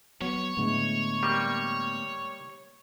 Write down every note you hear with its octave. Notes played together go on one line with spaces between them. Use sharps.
F#3 B3 C#5
A2 D3 G#3 A3 B3
G3 A#3